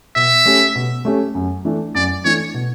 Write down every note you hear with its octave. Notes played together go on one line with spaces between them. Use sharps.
B2 E5
A3 C#4 G4
B2
A3 C#4 G4
F#2
E3 A3 D4
F#2 D5
E3 A3 D4 C#5
B2